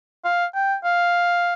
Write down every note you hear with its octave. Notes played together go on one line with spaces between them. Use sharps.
F5
G5
F5